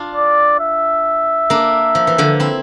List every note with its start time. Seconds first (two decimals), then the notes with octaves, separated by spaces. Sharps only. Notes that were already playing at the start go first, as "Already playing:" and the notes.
Already playing: D4 F4
0.15 D5
0.60 E5
1.50 A#3 D4
1.95 F3
2.07 E3
2.18 D3 F3
2.40 C4 E4